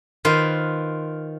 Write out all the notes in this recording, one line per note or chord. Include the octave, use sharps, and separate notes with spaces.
D#3 F4 B4 C5